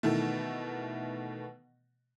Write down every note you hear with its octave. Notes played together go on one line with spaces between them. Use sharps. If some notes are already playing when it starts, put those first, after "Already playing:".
B2 D#3 E3 A3